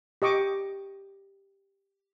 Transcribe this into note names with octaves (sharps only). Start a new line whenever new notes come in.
G4 D#5 C#6 D6